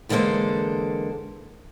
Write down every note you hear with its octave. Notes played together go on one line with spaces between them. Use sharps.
E2 D3 G#3 A#3 A4 C5